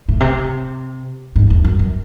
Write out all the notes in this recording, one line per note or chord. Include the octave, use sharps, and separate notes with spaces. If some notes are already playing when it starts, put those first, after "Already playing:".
A2
C3
G#2
E2
F#2
F#2